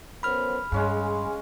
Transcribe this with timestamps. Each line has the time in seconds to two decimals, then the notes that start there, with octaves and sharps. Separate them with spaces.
0.23 F#2 B3 C5 B5 F6
0.72 G2 G#3 C#4 G#4 F5